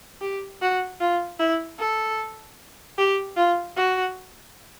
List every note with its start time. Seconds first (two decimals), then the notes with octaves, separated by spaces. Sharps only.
0.21 G4
0.62 F#4
1.00 F4
1.39 E4
1.79 A4
2.98 G4
3.36 F4
3.77 F#4